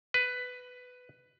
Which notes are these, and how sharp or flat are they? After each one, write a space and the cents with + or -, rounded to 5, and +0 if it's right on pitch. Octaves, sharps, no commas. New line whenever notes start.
B4 +10